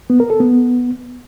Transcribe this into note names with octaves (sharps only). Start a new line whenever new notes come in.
B3
A#4
A4
B3